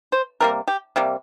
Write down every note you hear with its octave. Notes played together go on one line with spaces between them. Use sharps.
C5
C3 G3 A#3 A#4
G4
C3 G3 A#3